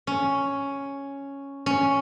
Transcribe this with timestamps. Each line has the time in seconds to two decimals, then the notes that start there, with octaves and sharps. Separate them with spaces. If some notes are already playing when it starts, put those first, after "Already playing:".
0.07 C#4
1.66 C#4